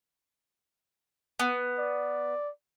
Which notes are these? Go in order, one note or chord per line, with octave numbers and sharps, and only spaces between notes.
B3
D5